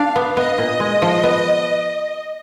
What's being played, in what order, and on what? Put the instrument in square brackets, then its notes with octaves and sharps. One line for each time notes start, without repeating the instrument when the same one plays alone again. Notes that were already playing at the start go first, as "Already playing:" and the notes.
Already playing: [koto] D4 [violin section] F5
[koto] B3
[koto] B3 [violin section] D#5
[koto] A#2
G#3
F3
B3